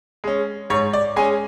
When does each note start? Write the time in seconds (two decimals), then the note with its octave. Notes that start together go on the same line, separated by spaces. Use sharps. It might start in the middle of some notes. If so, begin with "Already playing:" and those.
0.24 G#3 C#4
0.70 G#2 C#5
0.93 D5
1.16 G#3 C#4 G#5